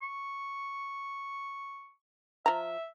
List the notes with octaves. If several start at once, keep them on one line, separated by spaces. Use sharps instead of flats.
C#6
F3 E5 A#5